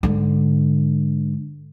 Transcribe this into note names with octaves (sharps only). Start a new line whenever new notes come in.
G#2 D3